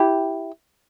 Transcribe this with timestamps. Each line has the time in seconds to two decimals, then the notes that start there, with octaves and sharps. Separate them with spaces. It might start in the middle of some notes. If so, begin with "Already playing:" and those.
Already playing: E4 G4